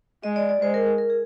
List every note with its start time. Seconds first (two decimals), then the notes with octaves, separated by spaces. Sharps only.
0.23 G#3 D#5
0.36 D5
0.49 D5
0.62 G#3 C5
0.74 A#4
0.87 G#4
0.98 A#4
1.10 G#4